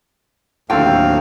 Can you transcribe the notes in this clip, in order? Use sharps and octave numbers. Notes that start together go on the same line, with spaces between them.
D#2 A2 D3 F#3 C4 A4 F5 G5